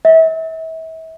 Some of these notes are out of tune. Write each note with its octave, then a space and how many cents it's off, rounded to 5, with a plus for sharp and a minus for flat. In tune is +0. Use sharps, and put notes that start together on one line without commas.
E5 -35